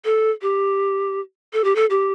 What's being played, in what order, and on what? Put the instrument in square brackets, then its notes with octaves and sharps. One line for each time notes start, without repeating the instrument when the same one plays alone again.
[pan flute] A4
G4
A4
G4
A4
G4